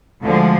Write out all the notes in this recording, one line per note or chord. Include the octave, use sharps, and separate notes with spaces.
D2 D3 F3 G#3